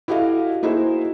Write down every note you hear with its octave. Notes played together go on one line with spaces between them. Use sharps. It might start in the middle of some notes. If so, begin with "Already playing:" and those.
E4 F#4 G4 A4 D#5 F5
A#3 D#4 E4 F#4 G#4 C5